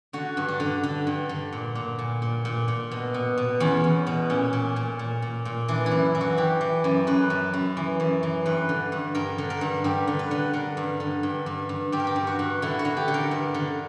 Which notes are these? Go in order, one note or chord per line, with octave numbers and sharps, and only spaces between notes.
D3 F#4
G2
D4
D3
D3
G2
D3
A#2
A#2
A#2
A#2
A#2
A#2
B2
B2
B2
E2 C#4
E2
B2
A#2 C#4
A#2
A#2
A#2
A#2
A#2
E3 D4
E4
F#2
E3
F#4
E3 G4
E3
F#2
F#2 B4
F#2
F#2
E3
F#2
E3
G2 B4
D3
G2
G2 A#4
D3
A#4
G2
G2 G4
D3
B4
D3
D3 A#4
G2
D3
G2
G2
G2
G2 G4
A#4
G4
G2
F#4
G2
D3 E4
F#4
D3
G4
D3
A#4
G2
D3